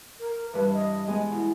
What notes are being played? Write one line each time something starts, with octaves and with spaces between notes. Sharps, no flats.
A#4
G2 E3 B4
D#5
G#3 B3 G#4
B2 E4